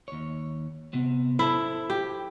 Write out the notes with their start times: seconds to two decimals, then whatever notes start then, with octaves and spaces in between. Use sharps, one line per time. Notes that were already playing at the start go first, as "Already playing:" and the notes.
0.08 D#2 C#5
0.93 C3 B3 C4
1.39 E4 A4 C5 A5
1.90 G4